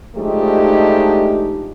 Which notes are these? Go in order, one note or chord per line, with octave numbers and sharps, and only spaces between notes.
F3 G#3 A3 D4 D#4 G4